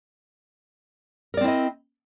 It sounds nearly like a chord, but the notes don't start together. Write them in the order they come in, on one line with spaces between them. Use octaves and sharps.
A#4 D5 C4 E4 D#5